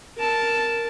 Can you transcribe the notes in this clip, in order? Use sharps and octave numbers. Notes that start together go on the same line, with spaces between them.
A#4 A5